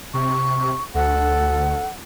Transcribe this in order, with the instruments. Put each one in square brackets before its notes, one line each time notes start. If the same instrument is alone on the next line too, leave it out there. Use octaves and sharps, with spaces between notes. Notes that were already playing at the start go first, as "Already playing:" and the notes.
[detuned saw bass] C3 [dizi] C#6
[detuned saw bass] D2 [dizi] A4 [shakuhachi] F#5